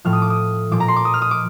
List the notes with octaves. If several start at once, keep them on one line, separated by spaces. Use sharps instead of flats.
A2 F3 F6
D#6
D6
D#6
A#2 F3 D6
A#5
C6
D6
D#6
F6
D#6
D6